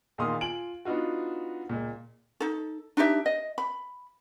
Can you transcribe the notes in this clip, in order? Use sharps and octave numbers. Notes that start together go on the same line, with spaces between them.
E2 A#2 D#3 F5 C6 D#6
F4 G#5 D7 F#7
B3 D4 D#4 F4 F#4
C#2 A#2
D#4 A4
D4 D#4 G4 E5
D#5
B5